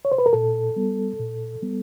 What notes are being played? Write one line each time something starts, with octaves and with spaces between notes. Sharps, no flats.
C#5
C5
B4
A#4
A#2 A4
G3 B3
A#2
G3 B3